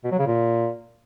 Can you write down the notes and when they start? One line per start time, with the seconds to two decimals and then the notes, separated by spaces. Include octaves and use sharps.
0.04 B2
0.12 F#3
0.19 C#3
0.26 A#2